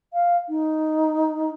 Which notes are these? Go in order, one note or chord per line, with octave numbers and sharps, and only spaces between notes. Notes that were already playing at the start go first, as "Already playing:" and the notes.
F5
D#4